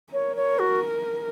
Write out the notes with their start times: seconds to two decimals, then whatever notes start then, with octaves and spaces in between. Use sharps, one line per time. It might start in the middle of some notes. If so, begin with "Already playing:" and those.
0.13 A#4 C#5
0.36 C#5
0.59 F#4